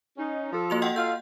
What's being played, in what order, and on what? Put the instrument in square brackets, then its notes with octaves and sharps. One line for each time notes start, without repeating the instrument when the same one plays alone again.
[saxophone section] C#4 D#4
F3 A4
[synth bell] A#3 F#4 F7
D#5 F#5 G5
[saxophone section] F4 A4 F5 [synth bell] G6